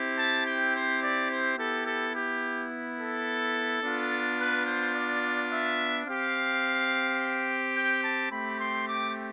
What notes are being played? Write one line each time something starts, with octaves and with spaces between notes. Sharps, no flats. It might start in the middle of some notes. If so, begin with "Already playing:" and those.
Already playing: C4 E4 G4
A5
G5
C5
D5
C5
B3 E4 G4 A4
A4
G4
A4
B3 D4 F4
B4
C5
D5
E5
C4 G4 F5
G5
A5
A3 C4 G4 B5
C6
D6